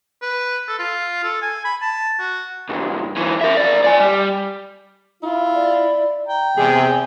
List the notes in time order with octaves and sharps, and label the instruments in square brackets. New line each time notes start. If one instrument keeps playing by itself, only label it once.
[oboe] B4
A4
F4
A4
G#5
B5
A5
F#4
[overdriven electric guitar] C#2 G2
E3 F#3
A#4 E5
F3 D5
D5 G#5
G3
[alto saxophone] E4 [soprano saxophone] F4
[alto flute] D5
[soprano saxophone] G5 [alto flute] A#5
[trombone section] E2 C3 [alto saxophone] G#4 [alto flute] G#5